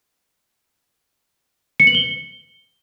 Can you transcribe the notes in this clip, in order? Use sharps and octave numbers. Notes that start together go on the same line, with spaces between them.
C#7
F#7
G7